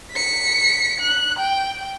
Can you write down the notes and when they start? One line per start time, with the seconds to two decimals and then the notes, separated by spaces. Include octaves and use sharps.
0.12 B6 C#7
1.00 F#6
1.39 G5